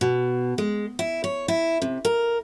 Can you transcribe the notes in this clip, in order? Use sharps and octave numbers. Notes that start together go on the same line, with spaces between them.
B2
G#3
E4
C#5
E4
C3
A#4